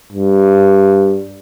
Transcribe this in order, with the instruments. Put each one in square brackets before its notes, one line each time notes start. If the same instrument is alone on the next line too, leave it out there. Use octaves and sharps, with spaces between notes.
[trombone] G2